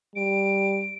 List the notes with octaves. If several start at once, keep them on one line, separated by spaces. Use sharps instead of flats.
G3 D7